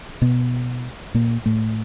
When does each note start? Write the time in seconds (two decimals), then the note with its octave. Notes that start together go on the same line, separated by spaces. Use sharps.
0.22 B2 B3
1.14 A#2 A#3
1.46 A2 A3